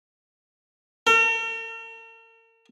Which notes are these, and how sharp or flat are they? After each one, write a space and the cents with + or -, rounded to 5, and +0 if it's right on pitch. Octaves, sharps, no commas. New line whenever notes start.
A#4 -45